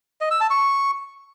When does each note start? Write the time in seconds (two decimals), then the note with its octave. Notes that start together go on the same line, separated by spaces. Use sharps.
0.21 D#5
0.31 E6
0.41 A5
0.50 C#6